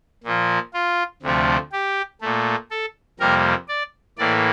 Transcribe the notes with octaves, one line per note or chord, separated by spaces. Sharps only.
A#2 F3 A#3
F4
D2 C3 F3 A3
G4
A#2 A3
A4
F2 C3 G3 A#3 A#4
D5
A2 E3 A#3 D5